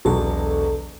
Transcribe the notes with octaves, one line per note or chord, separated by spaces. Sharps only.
E1 B1 F#3 A4